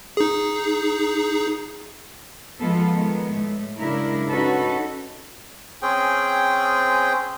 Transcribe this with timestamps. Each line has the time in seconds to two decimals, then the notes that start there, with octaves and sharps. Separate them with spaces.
0.17 D#4 G#4
2.60 F3 G#3 B3 F4 A4
2.91 D#3 G#3 A3 B3
3.32 A2 A3
3.80 C#3 F#3 G#3 D4 E4 A#4
4.31 C#4 D#4 F#4 A4 B4
5.82 C4 C#4 G#4 G5